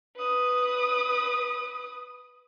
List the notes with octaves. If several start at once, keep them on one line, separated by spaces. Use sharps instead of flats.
B4 D#6